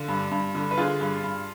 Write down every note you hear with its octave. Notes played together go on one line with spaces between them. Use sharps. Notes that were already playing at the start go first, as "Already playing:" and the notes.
Already playing: D3 F4
G2
G2
D3
B4
D3 F4 G#4
G2
G2